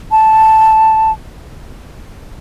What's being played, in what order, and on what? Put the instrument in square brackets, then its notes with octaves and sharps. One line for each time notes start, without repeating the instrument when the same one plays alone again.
[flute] A5